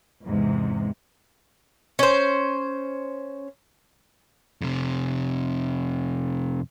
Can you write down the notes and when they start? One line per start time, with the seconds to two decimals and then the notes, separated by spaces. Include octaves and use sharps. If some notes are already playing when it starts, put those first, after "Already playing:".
0.24 E2 G#2 C3
1.99 C#4 C5
4.61 F2 C3